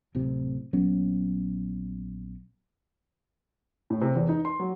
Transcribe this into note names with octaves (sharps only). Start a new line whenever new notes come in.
D1 A2 C3 C4
A#1 F#3 B3 C#4
A2
C3
E2
D#4
C6
F#3